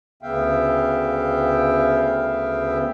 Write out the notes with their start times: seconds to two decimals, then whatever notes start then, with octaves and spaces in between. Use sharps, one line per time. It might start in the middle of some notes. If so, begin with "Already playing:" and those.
0.22 D2 C#3 B3 E5 F5 G5